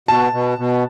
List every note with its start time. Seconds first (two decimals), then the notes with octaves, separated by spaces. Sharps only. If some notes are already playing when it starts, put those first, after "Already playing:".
0.08 B2 A5
0.33 B2
0.58 B2